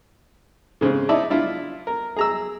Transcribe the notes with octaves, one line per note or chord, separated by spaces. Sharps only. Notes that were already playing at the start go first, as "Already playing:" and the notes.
G#2 C#3 C4
D#4 E4 D5 E5 A5
D4 E4 F4 E5
A#4
G#4 A#5 E6